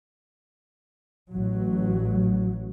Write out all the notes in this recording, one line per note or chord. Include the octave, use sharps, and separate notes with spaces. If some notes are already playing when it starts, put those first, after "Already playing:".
A1 F#3